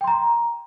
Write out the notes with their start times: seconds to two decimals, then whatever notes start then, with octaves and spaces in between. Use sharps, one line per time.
0.01 G5
0.04 C6
0.07 A#5